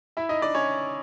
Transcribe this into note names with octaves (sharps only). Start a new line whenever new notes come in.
E4 E5
D#4 D#5
D4 D5
C#4 C#5